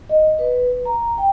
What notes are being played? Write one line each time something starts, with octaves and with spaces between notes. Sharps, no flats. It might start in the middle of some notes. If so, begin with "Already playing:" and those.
D#5
B4
A#5
G5